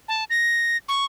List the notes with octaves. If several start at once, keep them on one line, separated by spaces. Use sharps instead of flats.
A5
A#6
C#6